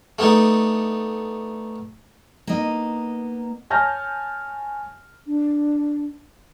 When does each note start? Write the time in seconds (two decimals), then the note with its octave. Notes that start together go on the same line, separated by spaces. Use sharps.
0.19 A3 B3 D4 D#4
2.47 A#3 B3 D#4 D#5
3.70 C#5 G#5 A5 F6 G6 A#6
5.27 D4